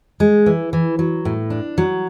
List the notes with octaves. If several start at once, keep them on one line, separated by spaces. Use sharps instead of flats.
G#3
E3
E3
F#3
A2
D4
F#3